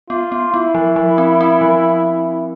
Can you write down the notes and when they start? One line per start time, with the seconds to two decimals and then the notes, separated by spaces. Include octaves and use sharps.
0.10 B3 F4
0.32 B3
0.54 B3 E4
0.75 F3
0.96 F3
1.18 C4
1.41 C4
1.61 F3